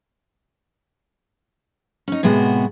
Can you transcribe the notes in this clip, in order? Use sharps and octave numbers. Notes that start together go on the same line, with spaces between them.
C#4 D#4
A2 C3 G#3 B3 F#4